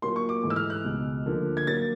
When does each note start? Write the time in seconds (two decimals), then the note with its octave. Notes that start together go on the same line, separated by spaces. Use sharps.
0.02 A#2 F#3 A#3 C6
0.16 C#6
0.29 D6
0.44 G#2 E3 A3
0.50 E6
0.56 F6
0.70 F#6
0.84 C#2 B2 G#3
1.26 D2 D3 F3 A#3
1.57 G#6
1.67 A#2 F#3 A#3 A6